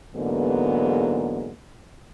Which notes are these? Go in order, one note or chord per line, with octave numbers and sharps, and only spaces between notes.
E2 G#2 D3 F#3 A#3 B3